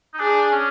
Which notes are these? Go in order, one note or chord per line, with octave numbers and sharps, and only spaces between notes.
D#4
D4 G#4
C#4